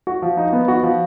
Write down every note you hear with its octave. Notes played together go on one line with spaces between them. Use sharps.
F#4
F3
D#4
B3
F#4
F3